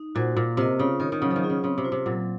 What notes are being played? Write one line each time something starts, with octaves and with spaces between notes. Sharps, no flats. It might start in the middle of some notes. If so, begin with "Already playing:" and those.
Already playing: D#4
A#2 F#4 C5 F#5
A#2 A#3
C3 F4 A#4 D#5
C#3 F4
D#3 A#4 C#5
D#3
C#3 F#3
F3
D#3
C#4 F4 G#4
C#3
C#3 C4
C3
F4 C5
C3
A#2 F#3